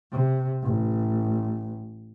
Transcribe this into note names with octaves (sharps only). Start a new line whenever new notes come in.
C3
A1